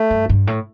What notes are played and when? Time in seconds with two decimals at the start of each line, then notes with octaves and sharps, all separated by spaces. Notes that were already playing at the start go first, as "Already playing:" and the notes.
Already playing: A3
0.11 G2
0.29 G2
0.47 A2